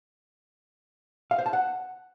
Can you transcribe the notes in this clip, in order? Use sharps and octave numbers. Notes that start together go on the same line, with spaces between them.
F5
C5
A5
F#5